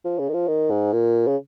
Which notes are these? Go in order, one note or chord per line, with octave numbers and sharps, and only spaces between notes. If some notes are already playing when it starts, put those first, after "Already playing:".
F3
C#3
D#3
F3
D#3
G#2
A#2
C#3